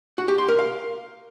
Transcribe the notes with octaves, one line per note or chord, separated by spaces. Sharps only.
F#4
G4
C6
A#4
F5